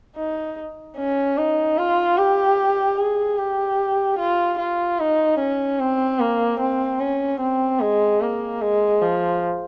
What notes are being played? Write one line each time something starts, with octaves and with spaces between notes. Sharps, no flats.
D#4
C#4
D#4
F4
G4
G#4
G4
F4
F4
D#4
C#4
C4
A#3
C4
C#4
C4
G#3
A#3
G#3
F3